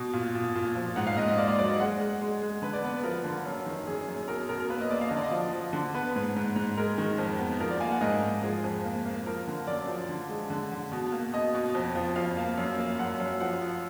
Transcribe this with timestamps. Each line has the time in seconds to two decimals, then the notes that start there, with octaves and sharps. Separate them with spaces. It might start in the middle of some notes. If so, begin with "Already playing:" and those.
Already playing: B2
0.13 A#2
0.35 A#2
0.55 A#2
0.75 F3
0.96 G#2 F#5
1.07 F5
1.17 G#2 D#5
1.28 D#5
1.37 A#3 D5
1.48 D5
1.59 F#3 D5
1.69 D#5
1.80 G#3 F#5
2.00 G#3
2.21 G#3
2.42 G#3
2.62 D3 B4
2.73 D5
2.83 B3 B4
3.03 F3 A#4
3.24 D3
3.46 F#2
3.66 D#3
3.87 F#2 G#4
4.08 F#2
4.28 B2 A#4
4.49 B2 A#4
4.60 A#4
4.69 A#3 B4
4.81 D#5
4.90 A#3 D5
5.01 F5
5.08 D3 D#5
5.17 D5
5.23 D#5
5.31 F3
5.53 F3
5.73 D3
5.94 B3 B4
6.16 G#2
6.36 G#2
6.56 G#2
6.77 G#3 A#4
6.98 D#3
7.18 F2
7.39 B3
7.60 F3 A#4
7.71 D5
7.80 A#3 G#5
7.92 F#5
8.01 G#2 D#5
8.23 G#2
8.43 F3 G#4
8.64 F2
8.85 A#3
9.05 A#3
9.26 F3 A#4
9.47 D3
9.67 F#2 D5
9.88 F3
10.09 D3
10.29 G#3
10.50 D3
10.72 D3
10.92 B2
11.12 A#3
11.33 B2 D#5
11.55 B2
11.75 F2
11.95 F3
12.16 F2 F5
12.37 A#3
12.58 F#2
12.78 A#3
12.99 F#2 F#5
13.20 F#2
13.40 F3 F#5
13.62 F3